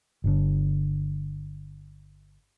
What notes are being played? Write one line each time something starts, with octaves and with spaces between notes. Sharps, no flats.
G1 D3